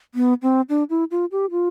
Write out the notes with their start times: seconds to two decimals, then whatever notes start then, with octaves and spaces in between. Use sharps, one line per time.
0.15 B3
0.42 C4
0.69 D4
0.90 E4
1.11 F4
1.32 G4
1.51 F4